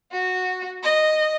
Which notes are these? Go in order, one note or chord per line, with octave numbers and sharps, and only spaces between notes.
F#4
D#5